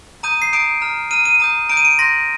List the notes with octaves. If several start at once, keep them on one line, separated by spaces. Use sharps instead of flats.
A#5 D#6 G6 D#7
C7
A#5 D#6 G6 D7
A#5 F6
A#5 F6 D#7
D#7
A#5 D#6 G6
A#5 D#6 G6 D7
D#7
D7
C6 G6 A#6